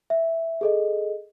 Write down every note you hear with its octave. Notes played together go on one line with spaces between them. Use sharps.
E5
G#4 A4 D#5